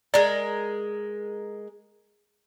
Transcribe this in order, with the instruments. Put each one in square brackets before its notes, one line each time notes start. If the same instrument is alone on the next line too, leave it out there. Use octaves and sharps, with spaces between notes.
[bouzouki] G#3 A#4 [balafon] D5